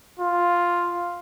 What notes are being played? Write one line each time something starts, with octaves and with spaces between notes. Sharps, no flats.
F4